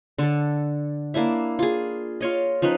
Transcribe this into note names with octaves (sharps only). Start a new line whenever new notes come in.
D3 A4
A#3 D4 E4 E5
F4 G#4
F4 C#5 D#5
F3 C#4 D#4 B4